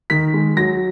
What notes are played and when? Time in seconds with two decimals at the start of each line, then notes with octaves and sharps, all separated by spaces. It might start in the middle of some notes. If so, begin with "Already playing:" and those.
0.10 D#3 B6
0.34 G#3
0.57 F#3 A#6